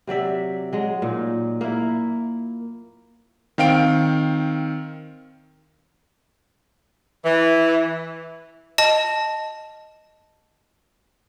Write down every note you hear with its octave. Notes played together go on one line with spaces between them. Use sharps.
C3 F#3 D5 E5
F#3 G#3
A#2 D#4
A#3 E4
D#3 C4 F5 G5 D7
E3
D#5 A5